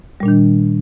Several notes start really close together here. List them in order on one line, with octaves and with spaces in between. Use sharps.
G3 A#2 D4 D#3